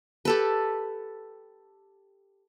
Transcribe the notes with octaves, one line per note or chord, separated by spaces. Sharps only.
G4 A4 B4